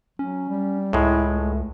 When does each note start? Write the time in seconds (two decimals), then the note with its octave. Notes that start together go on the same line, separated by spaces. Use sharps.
0.19 F#3 C#4
0.49 G3
0.93 C#2 A2 G#3 E4
1.33 A3